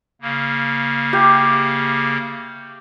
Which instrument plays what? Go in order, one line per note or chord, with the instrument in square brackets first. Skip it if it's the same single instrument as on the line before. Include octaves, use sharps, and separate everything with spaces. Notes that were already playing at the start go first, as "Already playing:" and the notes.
[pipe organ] C#3 A#3
[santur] G4